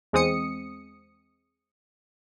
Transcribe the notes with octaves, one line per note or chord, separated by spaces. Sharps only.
E2 G#3 C4 D#6 C#7